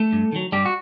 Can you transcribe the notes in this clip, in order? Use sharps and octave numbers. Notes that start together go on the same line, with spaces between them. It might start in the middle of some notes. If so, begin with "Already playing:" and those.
Already playing: A3 A4
G2
D#3 F#3
G2 G3 G4
F#4